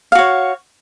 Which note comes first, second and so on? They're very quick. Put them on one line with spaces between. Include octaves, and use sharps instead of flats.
F5 F#4 C#5